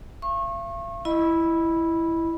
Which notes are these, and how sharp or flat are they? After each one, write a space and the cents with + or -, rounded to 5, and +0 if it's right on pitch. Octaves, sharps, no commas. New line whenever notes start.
F5 -45 C#6 -30
E4 +5 D#5 +0 B5 -15